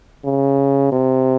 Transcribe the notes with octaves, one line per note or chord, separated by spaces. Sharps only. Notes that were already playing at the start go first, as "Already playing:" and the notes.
C#3
C3